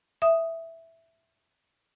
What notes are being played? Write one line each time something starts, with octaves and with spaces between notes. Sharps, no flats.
E5 D#6